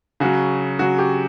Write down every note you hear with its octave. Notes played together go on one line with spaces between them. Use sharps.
C#3 F#3 F#4
C#3 F#3 F#4
G4